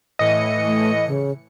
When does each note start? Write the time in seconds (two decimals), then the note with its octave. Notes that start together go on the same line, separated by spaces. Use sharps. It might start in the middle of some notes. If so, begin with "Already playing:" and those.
0.19 A2 E3 D#5 C#7
0.65 A3
1.07 C#3